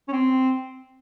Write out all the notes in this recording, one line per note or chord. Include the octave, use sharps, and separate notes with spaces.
C#4
C4